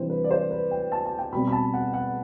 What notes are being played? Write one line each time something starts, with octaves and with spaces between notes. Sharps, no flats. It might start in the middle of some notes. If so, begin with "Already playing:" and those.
Already playing: C3 E3 G3 D4 C5
B4
D5
C5
B4
G5
A5
A5
G5
B2 G3 C4 B5
B5
A5
F#5
F#5